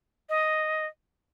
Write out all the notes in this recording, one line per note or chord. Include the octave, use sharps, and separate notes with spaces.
D#5